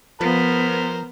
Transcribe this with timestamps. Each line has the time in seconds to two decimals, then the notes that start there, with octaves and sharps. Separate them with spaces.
0.21 F3 B3 A#4 C5